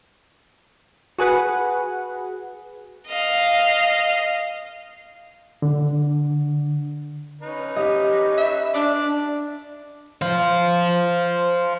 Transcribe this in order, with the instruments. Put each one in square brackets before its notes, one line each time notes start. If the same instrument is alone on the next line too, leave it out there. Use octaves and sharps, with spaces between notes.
[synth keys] F#4 G#4 B4 F#5
[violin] D#5 F5
[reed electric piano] D3
[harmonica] C#4 D#4 B4
[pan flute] G4 [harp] D#5
[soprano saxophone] E5
[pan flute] D4 [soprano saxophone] D5
[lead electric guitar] C5 F5